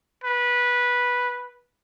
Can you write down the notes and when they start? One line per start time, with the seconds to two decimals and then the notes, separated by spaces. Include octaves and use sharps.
0.24 B4